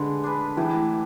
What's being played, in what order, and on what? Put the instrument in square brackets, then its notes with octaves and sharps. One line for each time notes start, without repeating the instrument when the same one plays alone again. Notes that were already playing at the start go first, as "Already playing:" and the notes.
Already playing: [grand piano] D3 [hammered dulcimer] G#3 B4
[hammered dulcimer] D4 G#4 B4
[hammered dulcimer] A2 [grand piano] E3